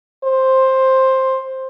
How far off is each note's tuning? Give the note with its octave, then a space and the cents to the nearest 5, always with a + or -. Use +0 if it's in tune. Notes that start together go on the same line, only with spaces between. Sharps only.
C5 +10